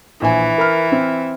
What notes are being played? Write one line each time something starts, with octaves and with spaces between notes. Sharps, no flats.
A#1 E3 G#5
A#4 B5 F6
C4